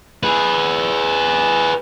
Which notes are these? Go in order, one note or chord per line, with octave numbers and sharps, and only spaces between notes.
G#4 B4